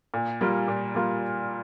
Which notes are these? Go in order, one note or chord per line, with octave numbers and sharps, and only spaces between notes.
A#2
G3 A#3 F4
A#2
G3 A#3 F4